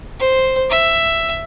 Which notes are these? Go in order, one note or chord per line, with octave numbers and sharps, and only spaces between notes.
C5
E5